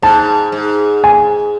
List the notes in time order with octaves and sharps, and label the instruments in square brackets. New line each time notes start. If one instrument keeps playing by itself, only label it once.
[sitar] G#2 [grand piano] A5
[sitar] G#2
[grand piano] G#5